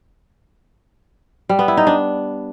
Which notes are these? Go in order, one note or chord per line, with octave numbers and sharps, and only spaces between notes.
G3
B3
E4
D#4
D4